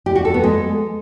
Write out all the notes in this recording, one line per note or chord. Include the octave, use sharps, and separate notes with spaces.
G4
F#4
A4
B3
G#3